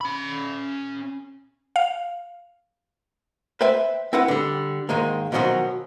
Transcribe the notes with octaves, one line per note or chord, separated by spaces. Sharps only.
C#4 B5
F5
B4 C5 E5 G5
C4 E4 B4 F#5
D3 G3
G#2 D#3 G#3 A#3
B2 D#3 F3 F#3 C#4 F#4